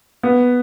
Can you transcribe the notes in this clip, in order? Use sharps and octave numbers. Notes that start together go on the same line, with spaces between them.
B3